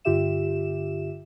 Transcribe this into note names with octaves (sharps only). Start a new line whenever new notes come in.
G2 D3 F4 G4 E5 E7